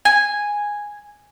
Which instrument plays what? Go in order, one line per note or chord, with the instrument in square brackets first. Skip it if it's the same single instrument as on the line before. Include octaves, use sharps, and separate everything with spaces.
[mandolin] G#5